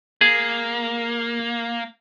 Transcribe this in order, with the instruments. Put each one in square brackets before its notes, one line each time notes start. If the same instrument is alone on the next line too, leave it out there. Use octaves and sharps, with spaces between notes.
[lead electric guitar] A#3 [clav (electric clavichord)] G#4